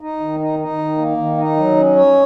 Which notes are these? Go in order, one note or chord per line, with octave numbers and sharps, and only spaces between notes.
D#4
D#3
D#4
D#4
D#3
A#3
D#3
D#4
F#3
C#4
C#5